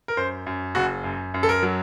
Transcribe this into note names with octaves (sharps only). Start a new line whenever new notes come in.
A#4
F#2 C5
F#2
F#1 F#4
F#2
F#2
A4
A#4
F#3